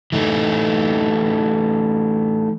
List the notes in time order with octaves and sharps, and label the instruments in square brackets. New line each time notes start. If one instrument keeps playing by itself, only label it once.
[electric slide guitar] E3 A3 D#4